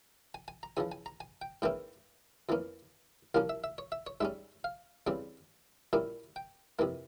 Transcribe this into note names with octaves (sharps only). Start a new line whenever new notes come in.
G#5
G#5
A#5
E2 C#3 F3 G#5
G#5
A#5
G#5
G5
G#2 E3 A#3 C#4 E4 G5
F2 E3 A#3 C#4
C2 A#2 F3 A#3 C#4 F5
E5
E5
C#5
E5
C#5
G#2 G3 C#4 E5
F5
E2 C#3 G3 C4
A#2 G3 A#3 C#4 E4
G5
F2 C3 E3 A#3